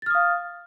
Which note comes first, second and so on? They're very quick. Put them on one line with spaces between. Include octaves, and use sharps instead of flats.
A6 F6 D#6 F5